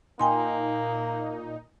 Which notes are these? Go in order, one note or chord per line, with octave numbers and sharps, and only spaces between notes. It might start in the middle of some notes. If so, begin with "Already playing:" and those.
A#2 A#3 D#4 G5 G#5 C6